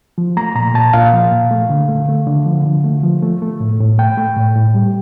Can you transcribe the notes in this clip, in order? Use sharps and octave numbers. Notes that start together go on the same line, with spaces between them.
F3
A3 A#5
A#2 A#5
A#2 A5
A#2 F5
F3
A#2
A3
D3
A3
A3
D3
F3
D3
A3
F3
A3
A3
A2
A2
A3 G5
A3
A2
A2
G3